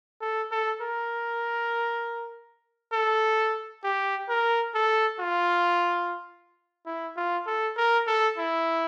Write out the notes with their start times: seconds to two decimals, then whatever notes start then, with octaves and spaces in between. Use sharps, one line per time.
0.21 A4
0.52 A4
0.82 A#4
2.93 A4
3.84 G4
4.29 A#4
4.75 A4
5.20 F4
6.86 E4
7.17 F4
7.47 A4
7.77 A#4
8.07 A4
8.38 E4